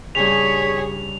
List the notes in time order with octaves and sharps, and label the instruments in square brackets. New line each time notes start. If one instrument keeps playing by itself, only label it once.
[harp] G2 C#3 [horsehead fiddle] G#4 C#5 [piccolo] B6 [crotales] F7